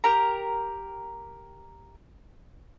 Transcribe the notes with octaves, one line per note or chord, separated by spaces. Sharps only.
G4 A#4 A#5